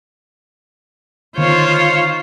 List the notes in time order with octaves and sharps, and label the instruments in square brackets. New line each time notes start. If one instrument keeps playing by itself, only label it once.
[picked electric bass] D3 D#3 B3 [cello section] D#4 F4 F5 [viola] C5 C#5